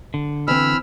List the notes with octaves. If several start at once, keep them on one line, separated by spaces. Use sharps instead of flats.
D3
E3 C4 B5 E6 F6